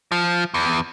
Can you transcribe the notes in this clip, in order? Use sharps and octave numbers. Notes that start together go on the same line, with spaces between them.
F3
E2